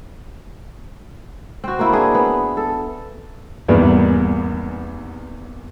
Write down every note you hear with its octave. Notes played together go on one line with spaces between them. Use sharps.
C4 F#4
A#3 E4
D4 G#4
B3
A4
G#1 E2 G3 A#3 B3 D5